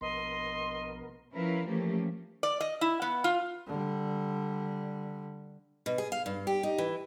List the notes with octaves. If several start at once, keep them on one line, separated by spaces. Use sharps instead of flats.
A#1 B2 B3 A#4 D#5 C6
F3 C#4 E4 A#4 B4 F5
E3 F3 A3 A#3 C#4 G4
D5
D#5
E4
B3
F4
D3 G3
B2
G#4
F5
G2
G4
D#4
E3